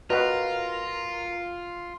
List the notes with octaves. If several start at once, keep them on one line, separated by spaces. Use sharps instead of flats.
F4 F#4 A#4 B4 D#5